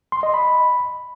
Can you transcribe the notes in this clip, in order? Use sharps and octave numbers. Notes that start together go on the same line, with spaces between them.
C6
D#5
B5